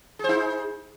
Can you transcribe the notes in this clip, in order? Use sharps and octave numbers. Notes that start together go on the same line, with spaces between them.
D#4 G#4 C5